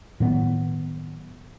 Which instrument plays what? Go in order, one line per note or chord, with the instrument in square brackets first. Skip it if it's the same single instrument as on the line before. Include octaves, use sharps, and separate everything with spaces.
[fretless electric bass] A2 D#3 F#3 B3